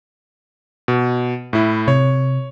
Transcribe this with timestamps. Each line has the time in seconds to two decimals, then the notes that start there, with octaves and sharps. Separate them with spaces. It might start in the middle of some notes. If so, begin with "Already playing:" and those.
0.88 B2
1.53 A2 E4
1.88 C3 C#5